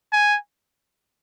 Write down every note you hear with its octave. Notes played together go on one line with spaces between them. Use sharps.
G#5